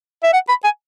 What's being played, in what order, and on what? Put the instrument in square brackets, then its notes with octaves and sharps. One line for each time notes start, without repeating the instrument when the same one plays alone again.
[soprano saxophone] E5
F#5
B5
G#5